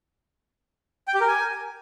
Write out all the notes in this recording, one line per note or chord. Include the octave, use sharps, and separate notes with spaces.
G5
G4
A#4
G#5